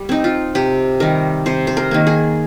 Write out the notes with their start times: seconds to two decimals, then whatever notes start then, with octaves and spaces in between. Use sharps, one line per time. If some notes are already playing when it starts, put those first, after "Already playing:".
Already playing: G3
0.09 C4 D#4
0.24 F4
0.55 C3 G4
1.00 D#3 G3 A#4
1.46 C3 C5
1.67 C5
1.77 A#4
1.91 D#3 A#3
2.07 G#4